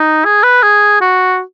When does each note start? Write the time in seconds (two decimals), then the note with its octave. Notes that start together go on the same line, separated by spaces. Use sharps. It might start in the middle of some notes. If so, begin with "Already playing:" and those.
Already playing: D#4
0.25 G#4
0.43 B4
0.63 G#4
1.01 F#4